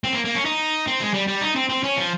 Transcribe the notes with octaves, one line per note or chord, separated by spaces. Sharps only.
C4
A#3
A#3
C#4
D#4
C4
G#3
G3
G3
D#4
C4
C4
C#4
F3